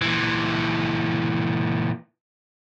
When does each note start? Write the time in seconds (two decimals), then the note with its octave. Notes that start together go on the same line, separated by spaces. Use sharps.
0.02 A#2 E3